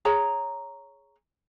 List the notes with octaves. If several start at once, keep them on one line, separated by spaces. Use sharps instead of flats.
G#4 C#5 A#5